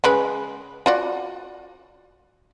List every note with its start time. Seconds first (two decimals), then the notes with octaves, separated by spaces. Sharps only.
0.04 C#3 G#3 B4
0.86 F4 F#4 D5